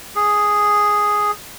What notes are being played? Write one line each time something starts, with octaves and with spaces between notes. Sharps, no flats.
G#4